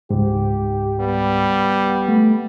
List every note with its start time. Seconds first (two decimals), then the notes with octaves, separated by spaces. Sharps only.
0.10 C#2 G#2 G4
1.00 G3 B3
2.09 A3